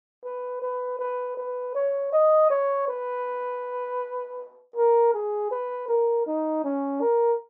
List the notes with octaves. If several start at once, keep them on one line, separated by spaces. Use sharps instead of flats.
B4
B4
B4
B4
C#5
D#5
C#5
B4
A#4
G#4
B4
A#4
D#4
C#4
A#4